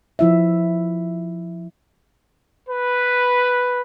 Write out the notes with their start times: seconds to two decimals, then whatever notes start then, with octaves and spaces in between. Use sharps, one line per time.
0.19 F3 E4 E5
2.67 B4